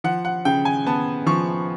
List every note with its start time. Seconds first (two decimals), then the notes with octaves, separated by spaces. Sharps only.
0.04 F3 F#5
0.25 F#5
0.45 C#3 G5
0.65 G#5
0.86 B3 A5
1.26 F3 C#6